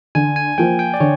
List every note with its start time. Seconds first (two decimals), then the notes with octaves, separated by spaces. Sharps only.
0.15 D3 G#5
0.36 G#5
0.58 F3 A#3 G5
0.79 G5
0.94 D5
1.00 D3 C#5